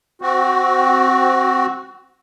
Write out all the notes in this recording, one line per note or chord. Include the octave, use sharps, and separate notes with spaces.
C4 F#4